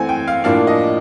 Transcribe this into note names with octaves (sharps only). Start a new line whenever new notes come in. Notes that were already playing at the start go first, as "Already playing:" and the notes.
Already playing: E3 A3 C4 F#5 G#5
G5
F5
A2 F3 A#3 D4 F5
D#5